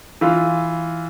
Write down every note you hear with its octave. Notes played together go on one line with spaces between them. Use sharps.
E3 F4